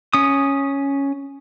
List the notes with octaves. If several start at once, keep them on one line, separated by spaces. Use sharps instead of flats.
C#4 D#6